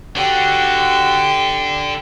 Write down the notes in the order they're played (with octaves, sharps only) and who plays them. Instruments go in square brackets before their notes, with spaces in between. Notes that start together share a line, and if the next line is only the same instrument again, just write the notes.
[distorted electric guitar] D3 [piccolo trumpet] F#4 [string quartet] G4